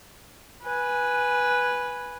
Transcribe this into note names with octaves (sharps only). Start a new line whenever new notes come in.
B4 G#5